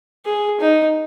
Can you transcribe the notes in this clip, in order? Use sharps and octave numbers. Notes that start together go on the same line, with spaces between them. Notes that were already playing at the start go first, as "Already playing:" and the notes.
G#4
D#4